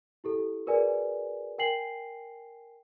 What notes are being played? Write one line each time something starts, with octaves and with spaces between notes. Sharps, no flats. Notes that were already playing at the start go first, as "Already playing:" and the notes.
E4 G4 A4
F#4 G#4 A#4 B4 D5 G#5
A#4 G5 G#5 C7 F#7